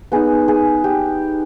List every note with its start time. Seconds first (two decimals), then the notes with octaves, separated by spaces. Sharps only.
0.12 B3 D#4 G#4
0.48 G#4
0.84 G4